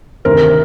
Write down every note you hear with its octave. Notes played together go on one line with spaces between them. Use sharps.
D2 C3 D#3 A#4 C5